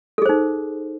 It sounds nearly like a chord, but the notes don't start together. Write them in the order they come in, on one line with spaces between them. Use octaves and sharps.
A4 G#4 C5 D#4